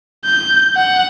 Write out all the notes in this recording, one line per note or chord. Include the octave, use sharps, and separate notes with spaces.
G6
F#5